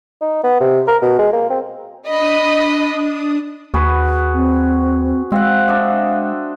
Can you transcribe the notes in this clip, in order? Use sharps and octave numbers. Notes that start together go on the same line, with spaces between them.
D#4
B3
C3
A#4
B2
G#3
A#3
C4
D4 D#5 B5 D#6
D#2 F#4 G#4 B4
C4
G#3 C4 F5 F#5
D4 D#5 E5